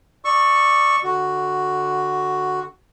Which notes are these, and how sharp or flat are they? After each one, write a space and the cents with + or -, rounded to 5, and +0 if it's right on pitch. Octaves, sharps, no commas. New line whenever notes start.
D5 +10 C#6 -5 E6 +0
D3 +0 F#4 +0